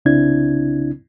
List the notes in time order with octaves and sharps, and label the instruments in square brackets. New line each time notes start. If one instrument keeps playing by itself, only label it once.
[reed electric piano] C2 C#3 C4 D4 E4 G#6